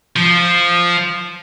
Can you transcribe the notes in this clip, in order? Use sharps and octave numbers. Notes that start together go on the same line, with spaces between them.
F3